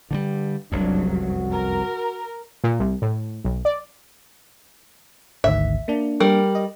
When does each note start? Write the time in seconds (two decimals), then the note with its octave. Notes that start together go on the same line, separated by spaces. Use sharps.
0.11 G2 D3 E3 G3
0.72 F1 C2 F#2 F#3 D4
1.10 F#4
1.50 A#4
2.64 A#2
2.79 C2
3.02 A2
3.44 B1
3.65 D5
5.44 G#1 D2 D#3 E5
5.88 A#3 D4
6.20 G3 A#4
6.55 D#5